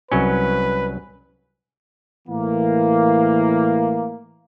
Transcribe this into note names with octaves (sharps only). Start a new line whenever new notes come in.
C2 F#3 C#4 B4
A2 E3 A#3